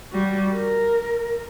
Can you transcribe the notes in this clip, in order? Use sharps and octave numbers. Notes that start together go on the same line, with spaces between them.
G3 F#4
A#4